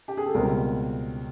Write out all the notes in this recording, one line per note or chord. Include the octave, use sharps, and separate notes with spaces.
G4
G#4
A4
C#2 B2 G3 C4 A#4